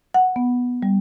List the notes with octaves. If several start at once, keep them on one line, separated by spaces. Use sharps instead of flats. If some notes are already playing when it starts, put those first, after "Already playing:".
F#5
B3
G3